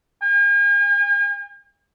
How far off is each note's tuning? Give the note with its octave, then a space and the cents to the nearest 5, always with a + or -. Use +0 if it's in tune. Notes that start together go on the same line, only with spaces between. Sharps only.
G#5 -45